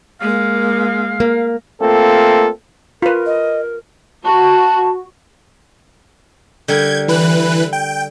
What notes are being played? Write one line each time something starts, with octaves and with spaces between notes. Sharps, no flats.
G#3 A#3 F5
A#3
A3 A#3 C4 F4 A4
F4 A#4 B4
D#5
F#4 A5
D3 G3 A#4 G6 G#6
E3 B4 F#6
G5